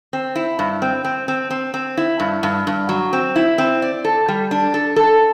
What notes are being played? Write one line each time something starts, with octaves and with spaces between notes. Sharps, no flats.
C4
E4
G2
C4
C4
C4
C4
C4
E4
G2
G2
G2
F#3
C4
E4
C4
D5
A4
G3
D4
A4
A4